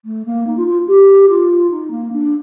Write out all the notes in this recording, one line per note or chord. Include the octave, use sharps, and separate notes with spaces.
A3
A#3
D#4
F4
F4
G4
F4
D#4
A#3
D4